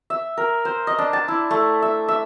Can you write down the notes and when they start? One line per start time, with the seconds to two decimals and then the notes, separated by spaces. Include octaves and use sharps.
0.10 E5
0.37 A#4
0.65 C5
0.87 D#5
0.99 D4
1.13 A5
1.28 E4
1.51 A3
1.82 E5
2.08 E5